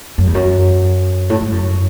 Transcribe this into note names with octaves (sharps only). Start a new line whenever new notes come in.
F#2
E2
F#2
A2
G#2
F#2